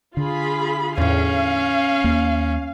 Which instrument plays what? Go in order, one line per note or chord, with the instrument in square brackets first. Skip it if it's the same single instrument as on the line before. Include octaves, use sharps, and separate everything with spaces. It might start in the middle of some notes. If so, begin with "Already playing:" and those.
[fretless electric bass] D3 [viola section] F4 G#4 B5
[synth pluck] E2 A2 [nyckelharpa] C#4 [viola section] F5
[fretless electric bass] D#2 A#3